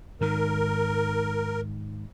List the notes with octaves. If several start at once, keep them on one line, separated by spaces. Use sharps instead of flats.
G#2 D#3 A#4